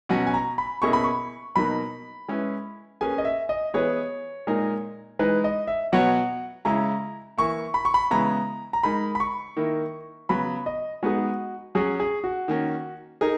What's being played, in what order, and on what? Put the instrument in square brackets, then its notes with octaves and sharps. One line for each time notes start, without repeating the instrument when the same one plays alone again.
[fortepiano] B2 F#3 C#4 F#4 [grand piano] F#5
[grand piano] G#5
A#5
B5
[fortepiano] B2 A#3 C#4 E4 G#4 [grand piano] C#6
[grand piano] B5
C#6
[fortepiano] B2 F#3 A#3 D#4 [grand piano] B5
[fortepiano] G#3 C#4 E4 B4
[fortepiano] A#3 C#4 G#4 B4 [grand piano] G#5
[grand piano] D#5
E5
D#5
[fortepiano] E3 B3 E4 G#4 B4 [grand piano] C#5
[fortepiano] A#2 G#3 D#4 A#4
[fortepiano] E3 G#3 D#4 [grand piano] B4
[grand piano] D#5
E5
[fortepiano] B2 F#3 B3 F#4 C#5 [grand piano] F#5
[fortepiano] C#3 G#3 C#4 E4 [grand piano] A#5
[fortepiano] E3 A#3 E4 [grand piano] C#6
[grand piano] B5
C#6
B5
[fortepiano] C#3 E3 G#3 B3 E4 [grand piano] A#5
[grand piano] A#5
[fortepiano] G#3 D#4 A#4 [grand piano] B5
[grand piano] B5
C#6
[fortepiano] D#3 A#3 E4
[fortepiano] C#3 F#3 B3 [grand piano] B5
[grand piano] D#5
[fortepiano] G#3 B3 D#4 G#4 [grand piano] F#4
[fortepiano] F#3 C#4 F#4 [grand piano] G#4
[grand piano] G#4
F#4
[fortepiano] D#3 A#3 C#4
[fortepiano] D#4 G#4 [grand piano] A#4